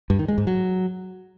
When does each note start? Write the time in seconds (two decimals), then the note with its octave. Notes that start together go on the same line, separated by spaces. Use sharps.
0.10 G2
0.19 D#3
0.28 G#3
0.38 G#2
0.47 F#3